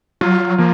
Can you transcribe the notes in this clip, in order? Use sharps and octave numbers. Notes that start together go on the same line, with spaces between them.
F#3 F4
F3 A#3